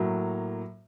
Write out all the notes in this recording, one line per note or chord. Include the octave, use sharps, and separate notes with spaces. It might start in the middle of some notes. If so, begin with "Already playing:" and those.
Already playing: A2 F#3 A#3